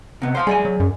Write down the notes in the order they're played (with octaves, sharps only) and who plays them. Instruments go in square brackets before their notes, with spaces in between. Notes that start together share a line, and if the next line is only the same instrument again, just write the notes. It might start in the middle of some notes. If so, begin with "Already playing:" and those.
[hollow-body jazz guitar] C3 B3
C5 F5 C6
[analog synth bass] G3 [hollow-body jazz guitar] G#4 D5 G#5
[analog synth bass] F#3
F#2